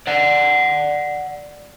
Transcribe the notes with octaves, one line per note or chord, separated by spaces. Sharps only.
D5 F#5